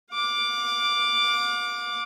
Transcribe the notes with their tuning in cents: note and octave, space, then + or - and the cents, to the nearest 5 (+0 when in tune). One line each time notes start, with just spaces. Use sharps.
F5 +45 D6 +0